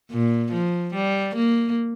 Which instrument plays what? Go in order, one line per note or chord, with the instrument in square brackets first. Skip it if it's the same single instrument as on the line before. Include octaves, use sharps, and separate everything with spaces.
[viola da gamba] A#2
F3
G3
A#3